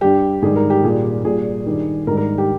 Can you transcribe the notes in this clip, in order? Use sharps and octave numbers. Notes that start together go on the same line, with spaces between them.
G2 G3 G4
G#2 D#3 G3 G#4
A#4
G4
A#2 G3 G#4
A#2 G3 G#4
G2 D#3 G3
G#2 D#3 G3 A#4
A#4
G4